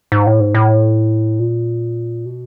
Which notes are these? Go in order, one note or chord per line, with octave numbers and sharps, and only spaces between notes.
G#2
A2
G#2
A2
A#2
B2